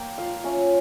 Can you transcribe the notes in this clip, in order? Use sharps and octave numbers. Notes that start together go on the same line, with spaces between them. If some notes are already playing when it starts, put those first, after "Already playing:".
Already playing: A#3 G5
F3 F5
C#4 E5